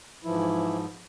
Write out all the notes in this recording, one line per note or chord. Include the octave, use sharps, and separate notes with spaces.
G#2 E3 F3 E4